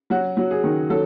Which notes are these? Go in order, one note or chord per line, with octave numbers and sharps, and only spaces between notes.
F#3 F#4
F#3
G#4
D#3
F#3 A4